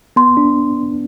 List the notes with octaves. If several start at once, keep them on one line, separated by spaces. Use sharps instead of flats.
B3 C6
D4